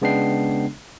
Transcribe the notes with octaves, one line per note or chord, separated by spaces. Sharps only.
C#3 G#3 B3 D4 G5 C7